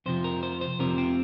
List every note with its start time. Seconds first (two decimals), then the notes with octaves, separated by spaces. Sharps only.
0.06 F2 C3 F3 C5
0.24 A#4
0.43 C5
0.61 C5
0.79 F2 C3 F3 A#4
0.98 C4